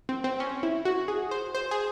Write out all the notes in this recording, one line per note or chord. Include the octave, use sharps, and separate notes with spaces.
C4
C4
C#4
E4
F#4
G#4
C5
C5
G#4